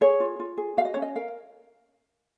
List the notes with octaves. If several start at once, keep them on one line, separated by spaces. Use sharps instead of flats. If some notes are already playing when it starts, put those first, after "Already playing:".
G#4 C#5
F4
F4
G#4
F#4 F5
D#5
C#4 C#5
D#5
A#4 F5